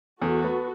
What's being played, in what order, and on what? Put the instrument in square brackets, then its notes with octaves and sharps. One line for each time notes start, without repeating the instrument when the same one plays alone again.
[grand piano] E2 [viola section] F#4 A4
[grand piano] B3